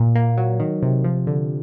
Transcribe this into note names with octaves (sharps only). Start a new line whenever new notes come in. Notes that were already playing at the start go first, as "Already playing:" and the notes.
Already playing: A#2
A#3
F#3
D#3
C3
F3
D3